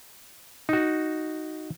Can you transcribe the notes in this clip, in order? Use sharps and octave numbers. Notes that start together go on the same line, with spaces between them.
D#4 F#4